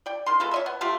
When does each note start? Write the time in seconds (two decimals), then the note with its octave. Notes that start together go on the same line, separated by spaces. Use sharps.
0.06 D5 G5
0.26 D#3 C6
0.40 G#3 B3 F4 A4
0.51 C#5 D#5 E5
0.66 B3
0.81 A3 F4 G4